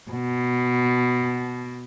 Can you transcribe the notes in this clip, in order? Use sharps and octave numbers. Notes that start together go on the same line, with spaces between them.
B2